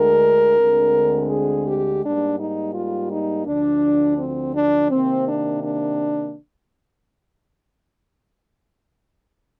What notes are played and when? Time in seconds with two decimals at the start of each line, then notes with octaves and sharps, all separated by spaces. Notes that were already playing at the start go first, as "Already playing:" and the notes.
Already playing: D2 D3 G#3 A#4
0.59 D2 D3 G#3 C4
1.31 G#4
1.67 G4
2.02 G#2 G3 A#3 D4
2.39 D#4
2.74 F4
3.10 D#4
3.46 D2 D3 F3 D4
4.18 C4
4.54 D4
4.90 C3 D#3 A#3 C4
5.26 D4
5.62 D4